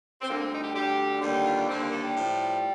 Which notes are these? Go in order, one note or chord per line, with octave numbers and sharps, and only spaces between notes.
C4
D2 D3 G3 A#3
C4
D#4
G4
D2 D3 G3 G4
D#2 D3 G3
D#4
F4
D4
D#2 D3 G3 C4
A#3
A3
G3
A2 F3